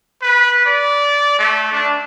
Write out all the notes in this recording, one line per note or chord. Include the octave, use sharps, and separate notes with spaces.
B4
D5
A3
D4